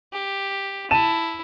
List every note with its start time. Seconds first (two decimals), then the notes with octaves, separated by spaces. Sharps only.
0.12 G4
0.91 E4 A5 D#7 E7